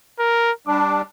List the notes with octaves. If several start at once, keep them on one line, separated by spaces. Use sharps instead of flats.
A#4
G3 D4 D6